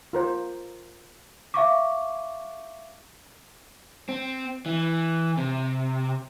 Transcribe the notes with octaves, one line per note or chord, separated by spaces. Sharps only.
F4 A#4 C5
E5 F5 C#6 D6
C4
E3
C3